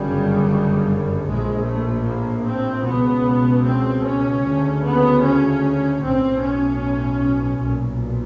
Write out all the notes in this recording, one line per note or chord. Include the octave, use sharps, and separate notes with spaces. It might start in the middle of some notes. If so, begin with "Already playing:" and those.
Already playing: G1 F#2 C#3 G3
G3
A#1 A2 G#3
A3
A#3
C4
C#2 B2 B3
C4
C#4
D2 C#3
B3
C#4
B1 A2 C4
C#4
B1 A#2